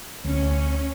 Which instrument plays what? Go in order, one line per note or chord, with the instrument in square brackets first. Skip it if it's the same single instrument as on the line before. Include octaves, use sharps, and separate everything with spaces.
[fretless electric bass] D2 [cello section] C#4